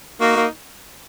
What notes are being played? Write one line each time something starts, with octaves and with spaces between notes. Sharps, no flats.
A#3 D#4 F#4
A#3